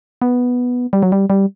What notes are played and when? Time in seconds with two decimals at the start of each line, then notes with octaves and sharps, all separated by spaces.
0.22 B3
0.93 G3
1.03 F#3
1.12 G3
1.30 G3